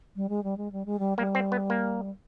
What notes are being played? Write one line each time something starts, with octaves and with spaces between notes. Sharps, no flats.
G3
G#3
G3
G#3
G3
G#3
G3
G3 A#3
C4
B3
A#3